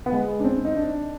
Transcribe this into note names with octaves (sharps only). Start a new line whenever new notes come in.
B3
G#3
D4
C4
D#4
D4